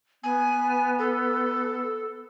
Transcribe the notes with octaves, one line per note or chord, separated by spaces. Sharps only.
B3 G#5
A4